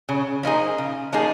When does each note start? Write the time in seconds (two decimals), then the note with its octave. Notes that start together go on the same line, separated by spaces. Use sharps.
0.09 C#3
0.43 F3 A#3 D#4 G#4
0.78 C#3
1.13 F3 A#3 D#4 G#4